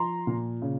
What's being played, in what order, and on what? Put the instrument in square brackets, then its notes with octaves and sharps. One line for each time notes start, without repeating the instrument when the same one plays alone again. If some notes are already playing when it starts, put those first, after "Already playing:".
Already playing: [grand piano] F3 A#5 C6
A#2
C#3